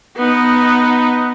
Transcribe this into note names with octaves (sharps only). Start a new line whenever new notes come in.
B3 D#4